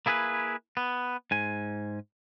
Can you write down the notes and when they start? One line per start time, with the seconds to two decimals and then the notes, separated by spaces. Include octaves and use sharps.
0.06 A#3 E4 G#4 A4 B4
0.77 B3
1.31 G#2 G#5